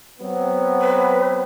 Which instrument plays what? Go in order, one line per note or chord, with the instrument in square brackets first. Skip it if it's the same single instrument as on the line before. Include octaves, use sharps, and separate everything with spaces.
[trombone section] F#3 B3 C4
[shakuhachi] B4